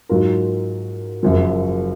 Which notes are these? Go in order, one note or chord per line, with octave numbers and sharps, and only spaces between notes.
G#2 F#3 A#3 F4 A#4
F#1 F#2 F3 A#3